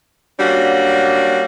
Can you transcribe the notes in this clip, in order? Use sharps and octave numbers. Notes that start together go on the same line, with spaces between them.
G3 A#3 C#4 D4 F#4